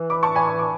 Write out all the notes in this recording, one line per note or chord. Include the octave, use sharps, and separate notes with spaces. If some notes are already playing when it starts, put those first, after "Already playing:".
Already playing: E3
B5 D6
A5 C#6
G#5 B5
C#6
D6